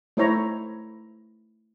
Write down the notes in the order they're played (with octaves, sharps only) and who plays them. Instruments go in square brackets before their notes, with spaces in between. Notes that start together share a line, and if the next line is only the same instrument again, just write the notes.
[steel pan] A3 D#4 E4 C5 C#5 A#5